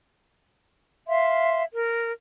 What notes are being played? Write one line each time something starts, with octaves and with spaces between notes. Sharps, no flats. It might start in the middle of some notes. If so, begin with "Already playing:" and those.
E5 F5 C6
A#4